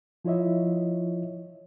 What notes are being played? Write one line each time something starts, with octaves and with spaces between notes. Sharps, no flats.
F3 E4 F4 C#5 D#5 E5